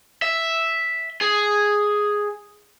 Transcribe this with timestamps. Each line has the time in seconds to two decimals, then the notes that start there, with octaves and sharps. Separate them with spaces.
0.22 E5
1.21 G#4